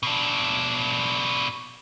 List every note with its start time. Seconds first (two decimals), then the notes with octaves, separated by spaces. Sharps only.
0.03 B2 D4